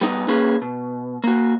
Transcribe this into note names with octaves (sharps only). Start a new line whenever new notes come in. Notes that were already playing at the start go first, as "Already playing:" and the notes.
G3 B3 D#4
A#3 C#4 G#4 B4
B2
A#3 F#4